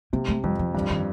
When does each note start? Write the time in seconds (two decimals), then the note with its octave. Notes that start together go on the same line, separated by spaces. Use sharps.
0.13 C3 A#3
0.28 A3
0.44 F2 G3
0.59 F3
0.74 G2 D#3
0.90 D#3